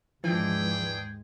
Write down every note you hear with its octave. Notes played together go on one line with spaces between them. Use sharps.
D#2 G#2 E3 F3 G#3 D4 G#4 G5